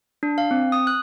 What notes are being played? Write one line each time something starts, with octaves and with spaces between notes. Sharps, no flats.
D4
F5
C4
D#6
F#6